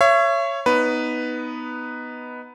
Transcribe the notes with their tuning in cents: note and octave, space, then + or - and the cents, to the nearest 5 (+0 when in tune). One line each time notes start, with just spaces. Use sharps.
C#5 +0 E5 +40
B3 +0 D#4 +5 B4 +5